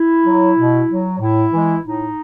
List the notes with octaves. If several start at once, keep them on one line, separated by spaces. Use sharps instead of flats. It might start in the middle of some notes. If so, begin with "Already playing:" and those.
Already playing: E4
F#3
B2
F#3
A2 E4
E3 G#3
A2 D#4